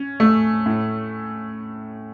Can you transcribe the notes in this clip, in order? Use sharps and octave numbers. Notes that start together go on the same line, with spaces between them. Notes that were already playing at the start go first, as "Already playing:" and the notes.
Already playing: C#4
A3
A2